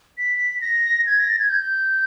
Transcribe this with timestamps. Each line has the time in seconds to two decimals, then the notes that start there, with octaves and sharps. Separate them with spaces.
0.18 B6
0.61 A#6
1.06 G#6
1.19 A#6
1.30 A6
1.39 G#6
1.50 G6